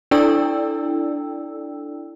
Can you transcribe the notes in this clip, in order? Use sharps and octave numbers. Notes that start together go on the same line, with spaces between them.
D4 E4 A4 D5 G5 E6